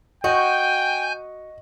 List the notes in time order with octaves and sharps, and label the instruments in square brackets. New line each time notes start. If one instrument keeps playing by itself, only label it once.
[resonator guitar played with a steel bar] F#4 [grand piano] D#5 [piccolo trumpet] G5 [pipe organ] G#5 G6